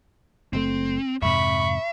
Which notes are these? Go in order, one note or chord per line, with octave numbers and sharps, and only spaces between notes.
F#1 A#2 A3 C4
F2 G#2 C3 E5 B5 C#6